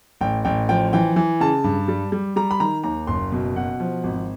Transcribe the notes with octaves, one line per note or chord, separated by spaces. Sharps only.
A1 G5
A1 G5
F3 G5
E3 G5
E3
C#3 A5
G2
G3
G3
G3 A#5
B5
D#3 A#5
D#2 A#5
F#1 C6
B2
B2 F#5
F3
G#1